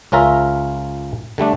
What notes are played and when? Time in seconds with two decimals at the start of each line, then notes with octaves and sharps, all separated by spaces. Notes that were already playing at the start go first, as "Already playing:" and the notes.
0.12 C#2 C#4 F4 A#4 E5
1.38 D3 G3 A3 D4